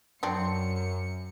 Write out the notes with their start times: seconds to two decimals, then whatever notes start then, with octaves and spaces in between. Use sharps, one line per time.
0.23 F#2 F#3 C4 D4 C#7